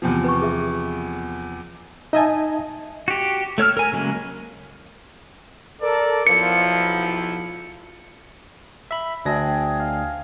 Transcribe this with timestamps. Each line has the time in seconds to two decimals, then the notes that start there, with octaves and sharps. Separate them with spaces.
0.02 E2 C3 F3
0.24 B4 C#6
0.41 G#4 E5
2.13 D#4 D#5 E5 G#5 A5
3.08 F#4 G4
3.58 A3 C#5 E6 F6
3.77 A#4 G#5
3.92 C#3 F#3 G#3 A#3
5.82 A4 A#4 D5
6.27 B1 F3 E4 C#7
8.91 E5 B5
9.25 D2 D4 G#4 E5 G5 A#6
9.80 F5